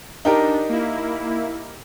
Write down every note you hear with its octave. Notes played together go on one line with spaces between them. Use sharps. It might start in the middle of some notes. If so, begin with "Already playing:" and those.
D4 D#4 G4 A#4
A#3 E4